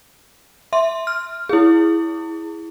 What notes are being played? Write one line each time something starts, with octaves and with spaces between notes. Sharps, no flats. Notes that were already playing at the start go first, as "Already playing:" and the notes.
E5 C6
F6
E4 G#4